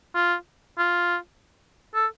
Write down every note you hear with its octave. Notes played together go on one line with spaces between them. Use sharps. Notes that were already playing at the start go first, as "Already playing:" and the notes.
F4
F4
A4